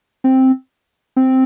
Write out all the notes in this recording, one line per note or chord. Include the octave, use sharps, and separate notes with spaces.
C4
C4